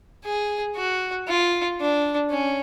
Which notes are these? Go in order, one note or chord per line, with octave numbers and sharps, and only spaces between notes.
G#4
F#4
F4
D4
C#4